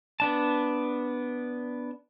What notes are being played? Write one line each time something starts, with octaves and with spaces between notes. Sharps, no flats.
B3 D4 A5